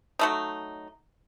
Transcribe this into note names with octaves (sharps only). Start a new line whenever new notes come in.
F#3 A3 D#4